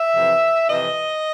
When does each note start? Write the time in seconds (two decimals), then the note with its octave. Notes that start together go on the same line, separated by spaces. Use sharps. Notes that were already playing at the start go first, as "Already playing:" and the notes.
Already playing: E5
0.15 F2 C3 E3
0.69 F2 C3 E3 D#5